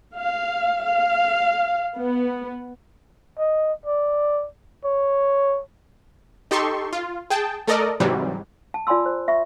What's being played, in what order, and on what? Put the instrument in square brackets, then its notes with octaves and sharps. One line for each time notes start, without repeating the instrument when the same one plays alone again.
[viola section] F5
F5
B3
[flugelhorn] D#5
D5
C#5
[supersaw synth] D#4 G4 A4 C6 C#6
F4
G#4 G5 A5
A3 A4 A#4 D5 D#5
G#2 C3 E3 F#3 G3
[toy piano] A5
F4 D5 G#5 B5 C6 E6
C5
E5 B5 C#6